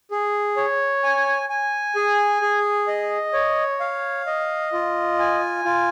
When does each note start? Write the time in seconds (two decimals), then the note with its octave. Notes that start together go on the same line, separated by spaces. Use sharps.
0.11 G#4
0.57 C#5
1.04 G#5
1.49 G#5
1.96 G#4
2.41 G#4
2.88 D#5
3.33 C#5
3.80 F5
4.26 D#5
4.73 F4
5.19 G#5
5.65 F4